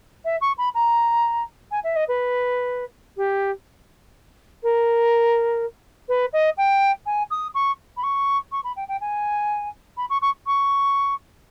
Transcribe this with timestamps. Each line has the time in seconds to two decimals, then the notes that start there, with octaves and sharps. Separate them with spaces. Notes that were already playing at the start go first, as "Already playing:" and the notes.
0.25 E5
0.41 C#6
0.58 B5
0.75 A#5
1.71 G#5
1.84 E5
1.96 D#5
2.08 B4
3.17 G4
4.63 A#4
6.09 B4
6.33 D#5
6.57 G5
7.06 G#5
7.31 D#6
7.55 C#6
7.97 B5
8.03 C#6
8.52 C#6
8.64 B5
8.76 G5
8.88 G5
9.01 G#5
9.97 B5
10.10 C#6
10.22 C#6
10.47 C#6